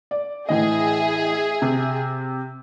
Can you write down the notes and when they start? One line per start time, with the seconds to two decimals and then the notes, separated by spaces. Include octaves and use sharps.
0.11 D5
0.49 A2 E3 G#4 D#5 E5
1.62 C3